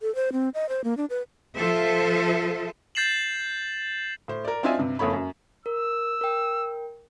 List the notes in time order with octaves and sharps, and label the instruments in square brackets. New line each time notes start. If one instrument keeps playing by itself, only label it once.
[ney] A4
C5
C4
D#5
C5
A#3
D4
B4
[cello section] F3 F4 A4 C5 E5
[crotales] G6 A6 C7 E7 F#7
[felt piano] A2 C5
A#4 D5
C4 D4 F4 D#5 E5 G#5
G2 C3
F#1 F2 A4 C#5 B5
F#2
[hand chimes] A#4 [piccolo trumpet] E6
[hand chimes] A#4 G5